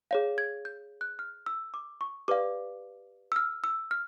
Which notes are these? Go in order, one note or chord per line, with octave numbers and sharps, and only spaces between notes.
G#4 C#5 F5
G#6
G6
F#6
F6
E6
D6
C#6
G4 B4 D5 F5 D6
E6
F6
E6
F6